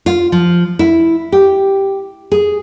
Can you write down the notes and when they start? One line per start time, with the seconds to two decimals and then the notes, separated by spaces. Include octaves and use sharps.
0.06 F4
0.32 F3
0.79 E4
1.32 G4
2.32 G#4